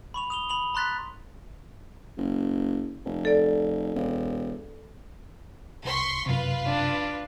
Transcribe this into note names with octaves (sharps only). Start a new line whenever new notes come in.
B5 C#6 F7
D#6 F7 G7
B5 F7 F#7
A#5 C6 F#6 A6 B6
F#1
F1
A4 D5
E1
C2 C6 C#6 B6
F#2 C3 F4 B4
D4